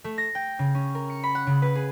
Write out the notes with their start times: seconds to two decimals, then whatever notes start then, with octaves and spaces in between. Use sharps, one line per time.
0.04 A3
0.18 A#6
0.35 G5
0.59 C#3
0.75 C#4
0.95 A#4
1.10 C#7
1.23 B5
1.35 F#5
1.47 C#3
1.62 B4
1.75 G#4